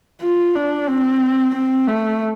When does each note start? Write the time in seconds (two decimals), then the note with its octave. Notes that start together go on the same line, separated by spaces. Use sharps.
0.22 F4
0.55 D4
0.89 C4
1.55 C4
1.88 A3